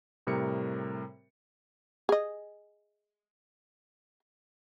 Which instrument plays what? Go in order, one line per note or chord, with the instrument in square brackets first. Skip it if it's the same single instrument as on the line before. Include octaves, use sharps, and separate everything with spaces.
[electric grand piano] A2 C3 G3 A#4 C#7
[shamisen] G#4 D#5